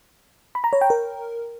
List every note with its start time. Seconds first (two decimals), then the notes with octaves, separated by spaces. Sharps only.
0.55 B5
0.64 A#5
0.73 C#5
0.81 G5
0.90 A#4